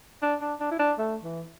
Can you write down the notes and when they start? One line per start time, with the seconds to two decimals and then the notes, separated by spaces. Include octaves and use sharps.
0.22 D4
0.41 D4
0.60 D4
0.72 E4
0.79 D4
0.99 A3
1.24 E3